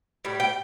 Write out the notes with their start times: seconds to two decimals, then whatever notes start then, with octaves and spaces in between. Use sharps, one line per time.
0.25 A2 G3
0.40 G5